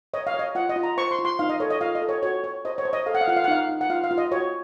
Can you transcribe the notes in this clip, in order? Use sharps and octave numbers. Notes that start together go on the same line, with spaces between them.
C#5 D#5
F5
C#5
D#5
F4 F#5
D#5
F4
A#5
C5 C#6
C6
F4
C6
D#4 F5
D#5
A4 C#5
D#5
F4 F5
D#5
A4
C#5
F#4 C#5
C#5
C5 D#5
C#5
C5
D#5
A4 F5
F#5
F5
F4 F#5
F5
F#5
D#4 F5
D#4
F#5
F4 F5
F5
F4
D#5
F#4 C#5